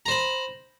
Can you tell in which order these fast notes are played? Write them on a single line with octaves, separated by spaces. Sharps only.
A#5 C5 B5